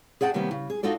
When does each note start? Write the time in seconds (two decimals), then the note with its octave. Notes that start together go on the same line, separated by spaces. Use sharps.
0.21 G#4 D5 F#5 G5 A5
0.34 C3 D#3 G3 A#3 B3 C#4
0.51 C#3
0.70 G#4
0.83 D#4 F4 F#4 A4 D5